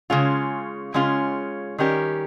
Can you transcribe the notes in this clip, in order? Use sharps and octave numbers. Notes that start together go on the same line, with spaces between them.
C#3 G#3 C#4 F4
C#3 G#3 C#4 F4
D#3 G3 C#4 G4 A#4